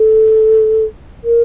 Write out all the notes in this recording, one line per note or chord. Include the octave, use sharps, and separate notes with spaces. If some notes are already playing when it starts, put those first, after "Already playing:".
Already playing: A4
A#4